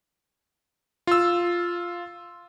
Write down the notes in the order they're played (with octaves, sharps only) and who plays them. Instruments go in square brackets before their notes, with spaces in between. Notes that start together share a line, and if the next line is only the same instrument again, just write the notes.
[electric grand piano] F4 E6